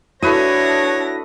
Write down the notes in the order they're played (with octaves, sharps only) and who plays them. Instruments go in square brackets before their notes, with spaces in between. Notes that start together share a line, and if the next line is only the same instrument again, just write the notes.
[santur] A3 B4 D#6 [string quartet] D4 A#6 [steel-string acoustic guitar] E4 F#4 [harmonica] C#5